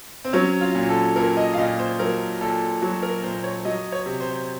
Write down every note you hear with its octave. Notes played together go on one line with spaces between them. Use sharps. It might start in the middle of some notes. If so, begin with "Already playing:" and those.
C4
F#3 C#4
F4
A#2
A4
A#2 A#4
D#5
F5
A#2 D#5
C5
F#3 A#4
A#2 A4
F#3 F#4
A#4
A#2 C5
C#5
F#3 D#5
C#5
C3
C5